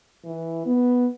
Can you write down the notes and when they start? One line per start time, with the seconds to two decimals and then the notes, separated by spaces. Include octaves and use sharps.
0.25 E3
0.66 B3